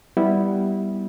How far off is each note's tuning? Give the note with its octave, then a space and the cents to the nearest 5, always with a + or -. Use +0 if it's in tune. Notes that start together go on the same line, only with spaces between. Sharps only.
G3 +0 B3 +0 E4 -15